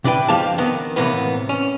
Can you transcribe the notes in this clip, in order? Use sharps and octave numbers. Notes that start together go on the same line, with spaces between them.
C3 D4 E4 B4 G5
F2 F3 G4 F5 A5
D#3 B3
A2 C3 E3 A#3 B3
C#4